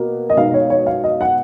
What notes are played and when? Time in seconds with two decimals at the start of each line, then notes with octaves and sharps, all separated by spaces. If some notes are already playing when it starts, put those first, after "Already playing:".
Already playing: B2 A#3
0.30 D#5
0.37 B2 G#3 D#4 F5
0.54 C#5
0.70 C#5
0.86 F5
1.04 D#5
1.21 F#5